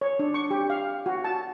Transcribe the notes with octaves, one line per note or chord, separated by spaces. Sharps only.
C#5
D4
C#6
G4
F5
F#4
A5